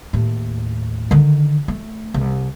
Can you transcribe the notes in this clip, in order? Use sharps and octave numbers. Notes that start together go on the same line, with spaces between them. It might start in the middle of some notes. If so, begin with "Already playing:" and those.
D#2 A2
D3 D#3
A3
C2